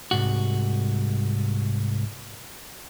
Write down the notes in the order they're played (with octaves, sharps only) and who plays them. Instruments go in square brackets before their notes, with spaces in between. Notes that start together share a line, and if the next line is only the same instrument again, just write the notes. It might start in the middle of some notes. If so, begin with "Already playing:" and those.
[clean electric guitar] C2 G#2 F#4